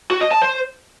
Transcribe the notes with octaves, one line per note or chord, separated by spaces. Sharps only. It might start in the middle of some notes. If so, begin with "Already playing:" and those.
F#4
D#5
A5
C5